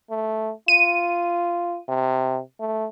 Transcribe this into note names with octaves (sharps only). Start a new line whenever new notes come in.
A3
F4 D#7
C3
A3